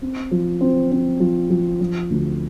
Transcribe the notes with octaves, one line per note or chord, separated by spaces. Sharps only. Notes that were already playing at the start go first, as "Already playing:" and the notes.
C4
F3
C4
C4
F3
F3
F3
D2